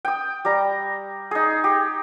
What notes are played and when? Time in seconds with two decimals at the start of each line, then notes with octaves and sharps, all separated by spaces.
0.05 G5 D#6
0.45 G3 A#5
1.31 D#4 G#4
1.64 G4